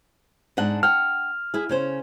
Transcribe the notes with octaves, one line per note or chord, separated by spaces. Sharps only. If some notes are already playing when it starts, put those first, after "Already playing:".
G#2 D4 F#5
F#5 G5 F6
E4 G#4
C#3 C#4 C5